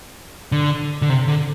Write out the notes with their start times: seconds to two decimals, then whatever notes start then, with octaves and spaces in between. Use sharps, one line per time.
0.52 D3
1.02 D3
1.09 C3
1.28 D3